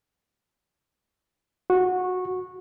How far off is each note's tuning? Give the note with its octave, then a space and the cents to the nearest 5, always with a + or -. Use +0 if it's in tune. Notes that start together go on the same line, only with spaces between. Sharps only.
F#4 -15